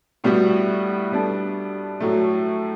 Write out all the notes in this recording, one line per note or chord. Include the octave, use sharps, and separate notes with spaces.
A2 G3 B3 F#4
G3 B3 D4 A4
A2 F#3 A3